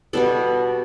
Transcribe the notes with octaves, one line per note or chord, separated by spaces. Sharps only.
B2 G3 B3 A4